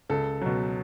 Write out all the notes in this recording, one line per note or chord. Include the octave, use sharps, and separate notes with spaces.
C#2 A4
B2 F#3